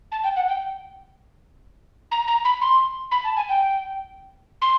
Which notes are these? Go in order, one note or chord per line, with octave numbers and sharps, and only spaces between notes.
A5
G5
F#5
G5
A#5
A#5
B5
C6
B5
A5
G#5
G5
C6